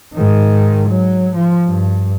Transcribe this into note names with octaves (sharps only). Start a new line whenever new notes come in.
G#2 D#3
F#3
F3
G2